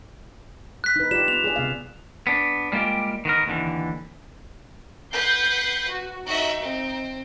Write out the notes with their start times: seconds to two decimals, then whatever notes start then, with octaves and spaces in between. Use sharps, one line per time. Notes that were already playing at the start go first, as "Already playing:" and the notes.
0.84 F#6 B6
0.96 D#4 B4
1.11 F4 G4 D5 E7
1.28 B3 F7
1.44 G#4 D5
1.56 C3 B3 F5
2.27 B3 D4
2.72 G3 G#3 A#3 F4 G4
3.25 D#3 B3 A#4
3.46 D#2 A2 D3 E3
5.13 B4 F#5 G6 C7
5.89 F#4
6.26 D#4 F#4 E5
6.62 C4